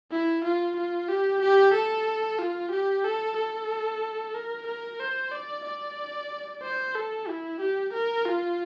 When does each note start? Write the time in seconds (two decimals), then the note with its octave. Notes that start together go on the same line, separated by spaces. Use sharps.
0.11 E4
0.44 F4
0.76 F4
1.09 G4
1.41 G4
1.74 A4
2.39 F4
2.71 G4
3.04 A4
3.37 A4
4.35 A#4
4.67 A#4
5.00 C5
5.31 D5
5.65 D5
6.62 C5
6.95 A4
7.28 E4
7.60 G4
7.93 A#4
8.25 F4